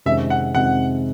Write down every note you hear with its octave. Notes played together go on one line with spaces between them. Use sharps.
F2 C3 D#3 G#3 C#4 E5
F#5
F2 C3 D#3 G#3 C#4 F#5